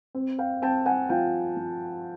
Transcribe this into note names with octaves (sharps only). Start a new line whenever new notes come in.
C4
F5 G5
C4 G5 A5
F#5 G#5
F3 F5 G5
F3